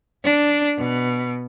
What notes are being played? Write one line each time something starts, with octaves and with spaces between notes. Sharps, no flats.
D4
B2